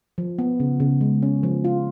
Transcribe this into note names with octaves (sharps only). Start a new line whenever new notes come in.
F3
B3
C#3
C#3
G#3
C#4
F3
F4